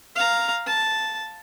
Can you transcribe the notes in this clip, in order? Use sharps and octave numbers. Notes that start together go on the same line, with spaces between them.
F5 A#5
A5